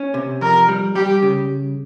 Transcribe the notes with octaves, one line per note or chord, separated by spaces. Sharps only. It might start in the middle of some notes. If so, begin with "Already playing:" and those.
Already playing: C#4
C3
F2 A#4
G3
G3 G4
C#3